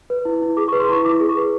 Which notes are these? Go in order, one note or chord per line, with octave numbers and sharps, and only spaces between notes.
B4
E4
E4
G#4 D6
B4 C#6
C6
E4 C#6
E4 D6
G#4
C#6
B4